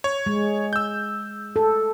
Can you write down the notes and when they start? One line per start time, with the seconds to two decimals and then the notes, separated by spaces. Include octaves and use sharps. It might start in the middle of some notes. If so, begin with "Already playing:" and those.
0.04 C#5
0.26 G#3
0.73 E6 G6
1.56 A4